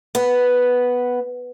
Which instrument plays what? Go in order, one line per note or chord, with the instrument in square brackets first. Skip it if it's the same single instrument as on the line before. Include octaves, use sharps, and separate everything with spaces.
[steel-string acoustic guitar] B3